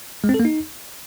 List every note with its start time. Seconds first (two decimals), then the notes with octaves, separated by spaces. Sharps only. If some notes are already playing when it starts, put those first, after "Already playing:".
0.24 G#3
0.29 C4
0.34 A4
0.40 A#3
0.45 D#4